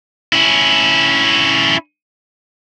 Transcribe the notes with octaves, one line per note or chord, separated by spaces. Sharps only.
C#4 E4